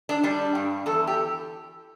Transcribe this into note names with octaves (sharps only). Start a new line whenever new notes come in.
D4
G3 D4
G2
E2 A4
G4